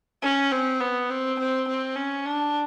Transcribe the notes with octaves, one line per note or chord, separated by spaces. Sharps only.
C#4
C4
B3
C4
C4
C4
C#4
D4